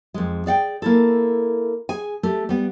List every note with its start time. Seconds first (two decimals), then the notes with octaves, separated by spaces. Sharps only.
0.14 F2 G#3
0.46 G#4 D5 F#5 G5
0.82 A#3 E4 A4
1.89 G#4 G#5
2.23 A3 G4
2.49 G3 B3